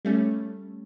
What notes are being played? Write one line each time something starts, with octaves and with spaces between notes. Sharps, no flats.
G3 A3 C#4